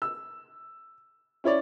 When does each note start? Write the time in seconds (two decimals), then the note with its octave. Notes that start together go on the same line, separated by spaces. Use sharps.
0.02 E6
1.44 C#4 E4 C#5 D5